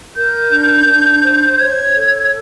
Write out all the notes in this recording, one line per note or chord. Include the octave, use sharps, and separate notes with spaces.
A#4 G6
D4
D4
C5
C#5 G#6
A4